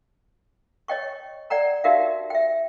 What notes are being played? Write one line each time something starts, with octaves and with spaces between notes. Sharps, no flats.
C#5 D#5 G5 C#6
D5 F#5 G5 A#5
D#4 F#4 G4 A#4 E5 F5
E5 G5